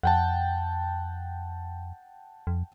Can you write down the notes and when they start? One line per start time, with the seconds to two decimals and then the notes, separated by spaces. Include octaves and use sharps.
0.03 F2 F#5 G5 A5
2.47 F2